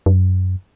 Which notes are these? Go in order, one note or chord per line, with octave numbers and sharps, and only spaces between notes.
F#2